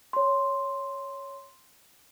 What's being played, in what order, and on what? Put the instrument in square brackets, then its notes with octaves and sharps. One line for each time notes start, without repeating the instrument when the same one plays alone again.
[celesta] C#5 C6